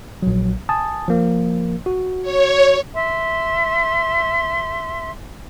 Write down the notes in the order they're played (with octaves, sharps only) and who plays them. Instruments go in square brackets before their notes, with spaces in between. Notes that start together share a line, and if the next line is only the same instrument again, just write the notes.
[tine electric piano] A#1 F#3
G#5 A5 D#6
F3 A#3
F#4
[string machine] C#5
[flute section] E5 C6